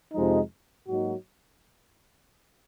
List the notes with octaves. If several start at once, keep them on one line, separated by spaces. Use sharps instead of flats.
F2 C3 F3 G#3 D#4
G#2 F#3 A#3 D#4 F#4